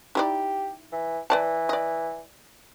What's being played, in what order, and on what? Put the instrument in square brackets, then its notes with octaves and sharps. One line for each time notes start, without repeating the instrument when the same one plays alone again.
[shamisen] D#4 E4 D5 [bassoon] G4
[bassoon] E3
[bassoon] E3 [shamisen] B4 D5 A5
[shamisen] D5 D#5